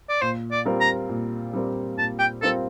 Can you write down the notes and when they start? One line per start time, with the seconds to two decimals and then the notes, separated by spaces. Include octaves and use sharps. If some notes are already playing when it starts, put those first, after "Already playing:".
0.09 D5
0.21 A#2 C5
0.51 D5
0.65 G3 C4 F4 A#4
0.80 A#5
1.09 A#2
1.53 G3 C4 F4 A#4
1.97 A#2 A5
2.19 G5
2.42 G3 C4 F4 A4 A#4